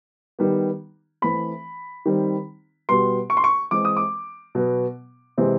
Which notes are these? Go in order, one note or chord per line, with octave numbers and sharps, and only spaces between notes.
D#3 G3 B3
E3 A3 C4 B5
D#3 G3 C4
B2 G3 B3 C6
C#6
C6
C#6
E3 G#3 C4 D6
D#6
D6
B2 F#3 B3
C3 E3 G#3 C4